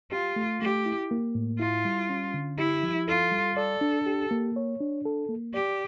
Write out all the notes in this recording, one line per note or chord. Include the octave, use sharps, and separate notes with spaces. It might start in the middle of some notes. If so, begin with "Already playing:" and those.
F4 G4
A3
A3 G4
E4
A#3
A2
E4 F4
G3
C#4
D3
E4 G4
F3
F4 A4
G3
A4 D5
D4
G4
A#3
C#5
D4
A4
A#3
G4 D5